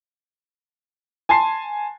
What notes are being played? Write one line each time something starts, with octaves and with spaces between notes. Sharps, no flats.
G#5 A5 C6 C7